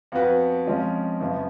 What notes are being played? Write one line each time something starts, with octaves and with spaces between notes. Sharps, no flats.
F2 F3 B3 F#4 B4
F2 F3 G#3 C#4 F4
F#2 C#3 F3 B3